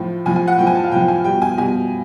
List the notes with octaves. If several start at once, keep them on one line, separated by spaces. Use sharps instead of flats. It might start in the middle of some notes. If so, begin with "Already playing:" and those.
Already playing: A2 F3
A2 F3 G#5
G#5
F#5
A2 F3 G5
G#5
A5
F5
A2 F3 G5
G#5
B2 G3 G5
G#5
B2 G3 G#5